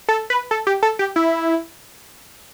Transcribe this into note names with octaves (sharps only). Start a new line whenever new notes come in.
A4
B4
A4
G4
A4
G4
E4